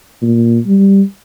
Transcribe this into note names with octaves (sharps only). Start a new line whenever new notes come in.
A#2
G3